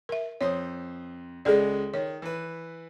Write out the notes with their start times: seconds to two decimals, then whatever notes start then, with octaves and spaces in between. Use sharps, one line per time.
0.09 A#4 E5
0.41 F2 C5 C#5 D#6
1.45 C#2 G#3 G#4 A4 D5
1.94 D#3 C#5
2.22 E3 B4